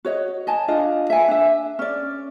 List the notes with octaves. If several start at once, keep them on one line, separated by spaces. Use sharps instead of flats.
F#4 C#5 D#5
D#5 G#5 A5
D4 F4 D#5
E5 G#5
D4 E5
C#4 D5